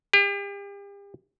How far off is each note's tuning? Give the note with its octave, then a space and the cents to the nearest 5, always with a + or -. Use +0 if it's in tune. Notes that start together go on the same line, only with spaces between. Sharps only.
G4 +40